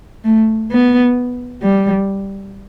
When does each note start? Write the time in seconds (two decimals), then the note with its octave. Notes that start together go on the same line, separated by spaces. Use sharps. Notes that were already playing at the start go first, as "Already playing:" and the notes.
0.24 A3
0.71 B3
1.62 G3